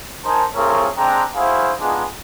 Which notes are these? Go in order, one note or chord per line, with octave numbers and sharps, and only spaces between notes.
D#4 A#4 C5 G#5 A5
A3 C4 F4 G#4 A#4 C#5
G#3 C4 D4 G5 A#5
E4 F#4 G#4 C5 F5
G#3 B3 D4 D#4 F4 G#4